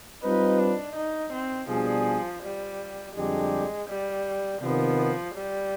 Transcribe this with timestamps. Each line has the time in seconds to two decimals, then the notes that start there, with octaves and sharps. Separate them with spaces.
0.23 G3 C4 D#4 F4 B4
0.59 D4
0.96 D#4
1.32 C4
1.69 B2 F3 G3 D4 G#4
2.42 G3
3.15 F2 D3 G3 G#3 D4 G4
3.88 G3
4.61 C3 D#3 F3 B3
5.34 G3